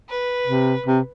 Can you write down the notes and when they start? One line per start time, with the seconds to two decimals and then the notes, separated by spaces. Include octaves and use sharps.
0.09 B4
0.47 C3
0.86 C3